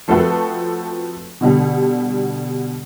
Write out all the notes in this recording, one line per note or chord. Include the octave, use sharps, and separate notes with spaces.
F3 A3 C4 F#4 A4 B4
B2 D3 G3